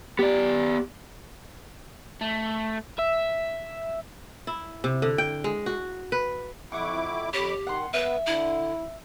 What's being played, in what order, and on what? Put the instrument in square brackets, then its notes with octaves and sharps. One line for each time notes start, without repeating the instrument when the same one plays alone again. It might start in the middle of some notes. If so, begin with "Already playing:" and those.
[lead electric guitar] B3 D5 [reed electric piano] G4
[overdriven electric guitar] A3
E5
[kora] E4
C3
D3
G5
G#3
F#4
B4
[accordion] F2 E4 D6 [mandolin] F#5 C#6
[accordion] F2 B5 D6 [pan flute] G4 [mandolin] C#5
[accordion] D#3 [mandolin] F#5 C6
[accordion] B3 [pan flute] B4 [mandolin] E5
[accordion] D3 [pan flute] E4